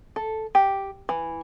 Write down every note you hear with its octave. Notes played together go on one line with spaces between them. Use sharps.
A4
G4
E3